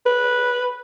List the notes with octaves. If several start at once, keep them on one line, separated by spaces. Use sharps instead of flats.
B4